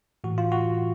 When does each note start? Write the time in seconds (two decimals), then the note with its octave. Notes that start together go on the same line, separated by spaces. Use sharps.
0.24 A2 E3 F#4
0.38 F4
0.52 F#4